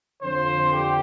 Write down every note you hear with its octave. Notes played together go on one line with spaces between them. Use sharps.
F2 D3 F3 C5
G4